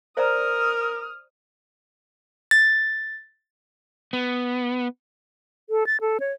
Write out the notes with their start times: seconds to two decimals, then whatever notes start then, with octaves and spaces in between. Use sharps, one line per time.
0.17 A#4 C5 D5 A#5 D#6 F6
2.51 A6
4.13 B3
5.70 A4
5.86 A6
6.01 A4
6.20 C#5